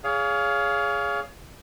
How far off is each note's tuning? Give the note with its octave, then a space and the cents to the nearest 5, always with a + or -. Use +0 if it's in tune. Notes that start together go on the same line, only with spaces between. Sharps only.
G#4 +0 C#5 +30 F5 +0